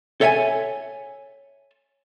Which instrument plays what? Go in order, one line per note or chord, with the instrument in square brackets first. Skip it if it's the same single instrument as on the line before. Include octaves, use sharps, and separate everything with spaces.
[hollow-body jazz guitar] A4 C#5 E5 G5 G#5